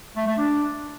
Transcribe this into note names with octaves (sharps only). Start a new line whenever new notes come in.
A3
A3
D4